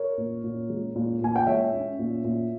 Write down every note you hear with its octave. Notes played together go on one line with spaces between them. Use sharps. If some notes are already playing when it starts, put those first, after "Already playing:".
Already playing: A#4 C#5
A#2
A#2
G#3
A#2
A#2 G#5
G5
G#3 C#5 E5
C#4
A#2
A#2